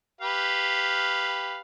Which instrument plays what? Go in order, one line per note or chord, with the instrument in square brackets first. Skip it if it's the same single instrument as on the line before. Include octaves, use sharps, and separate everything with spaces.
[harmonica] G4 B4 F5